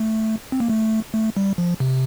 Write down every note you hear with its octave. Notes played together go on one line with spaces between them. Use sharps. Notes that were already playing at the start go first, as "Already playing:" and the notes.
Already playing: A3
C4
A#3
A3
A3
G3
F3
C3